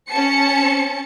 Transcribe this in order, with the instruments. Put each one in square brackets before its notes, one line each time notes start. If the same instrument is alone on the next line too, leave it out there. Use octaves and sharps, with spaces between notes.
[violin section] C#4 A5 C#7